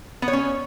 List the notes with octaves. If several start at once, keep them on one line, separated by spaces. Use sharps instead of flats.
B3
C#5
C#4